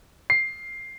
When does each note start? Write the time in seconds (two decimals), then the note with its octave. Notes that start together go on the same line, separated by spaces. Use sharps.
0.30 C7